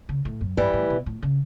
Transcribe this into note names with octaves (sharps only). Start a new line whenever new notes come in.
C#3
A2
F#2
G2 E3 G3
A2
B2
A2
C#3